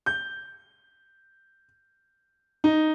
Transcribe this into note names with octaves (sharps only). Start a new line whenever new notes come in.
G6
D#4